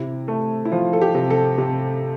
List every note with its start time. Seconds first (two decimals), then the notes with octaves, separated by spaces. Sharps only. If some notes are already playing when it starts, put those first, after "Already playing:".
Already playing: C3 E4
0.28 A3
0.65 E4
0.72 F3 F4
0.93 A4
1.02 G4
1.15 C3
1.30 A4
1.58 C3